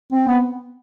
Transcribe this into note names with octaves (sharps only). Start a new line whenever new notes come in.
C4
B3